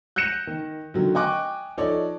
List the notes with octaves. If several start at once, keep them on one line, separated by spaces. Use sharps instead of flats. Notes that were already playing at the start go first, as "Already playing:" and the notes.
F#6 G6 A#6 C#7 E7
D#3
D3 D#3 F#3
D#5 G5 G#5 C#6 D6 F#6
F3 D#4 A4 C#5 D5